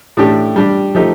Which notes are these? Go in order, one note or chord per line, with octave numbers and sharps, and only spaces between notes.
A2 A3 D4 G4
G3 D4 G4
F3 A3 D#4 G4